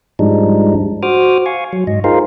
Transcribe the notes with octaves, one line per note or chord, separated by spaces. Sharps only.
G#2 F3 G3 G#3 D4 D#4
F#4 C5 D6 D#6 F6
F5 G#5 C#6
F#3
G#2 D#5
D#4 F4 G#4 A#4 C5 F5